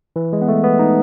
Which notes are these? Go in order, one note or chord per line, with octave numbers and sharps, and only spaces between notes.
E3
G#3
B3
A3
B3
D#4